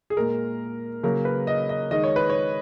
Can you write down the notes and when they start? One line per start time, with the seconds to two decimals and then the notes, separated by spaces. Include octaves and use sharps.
0.10 G#4
0.17 A#2 G#3 A#4
1.03 C#3 F#3 A#3 A#4
1.25 B4
1.47 D#5
1.69 D#5
1.91 D#3 G#3 D#5
2.04 C#5
2.16 B4
2.29 C#5